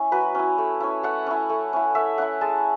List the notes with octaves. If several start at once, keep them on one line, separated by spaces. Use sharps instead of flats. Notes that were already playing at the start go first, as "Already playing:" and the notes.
Already playing: C#4 E4
F#3 B4
C#4 E4
A3
C#4 E4
A3 F#5
C#4 E4
A3
C#4 E4
A3 E5
C#4 E4 F#5
G#3 A5